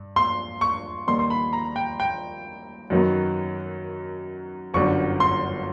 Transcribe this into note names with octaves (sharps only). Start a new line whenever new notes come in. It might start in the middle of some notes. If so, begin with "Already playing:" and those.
Already playing: G2
C6
C#6
D#2 D#3 G3 B3 C6
C6
B5
A#5
G5
G5
F#2 D#3 F#3 B3
G1 F#2 D3 G3 C#6
C6